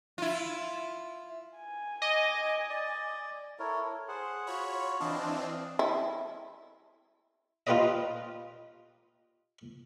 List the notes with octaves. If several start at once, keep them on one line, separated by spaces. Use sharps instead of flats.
E4 F4
G#5
D#5 D6
D5
E4 A4 A#4 C#5
G#4 C5 F#5
F4 F#4 C#5 B5
E3 C4 D4 D#5 F5 A5
E4
D#4 F4 G4 B4 D5 D#5